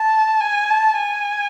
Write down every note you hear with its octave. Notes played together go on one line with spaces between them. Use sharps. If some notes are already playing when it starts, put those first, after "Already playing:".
Already playing: A5
G#5
A5
G#5